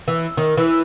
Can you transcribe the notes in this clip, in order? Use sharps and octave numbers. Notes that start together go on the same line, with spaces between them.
E3
D#3
E3